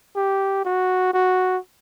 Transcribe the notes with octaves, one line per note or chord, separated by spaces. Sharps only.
G4
F#4
F#4